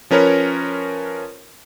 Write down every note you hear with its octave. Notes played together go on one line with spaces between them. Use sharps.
F3 C#4 A#4 B4 C#5